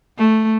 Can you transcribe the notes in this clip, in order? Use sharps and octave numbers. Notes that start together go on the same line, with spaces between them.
A3